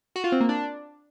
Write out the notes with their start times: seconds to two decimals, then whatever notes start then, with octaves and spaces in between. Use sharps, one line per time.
0.16 F#4
0.24 F4
0.32 C4
0.41 A#3
0.49 D4